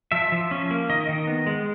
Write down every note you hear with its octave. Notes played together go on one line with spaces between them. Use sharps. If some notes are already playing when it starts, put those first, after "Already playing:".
F3 E5
F3
C#4
A#3
D#3 D#5
D#3
B3
G#3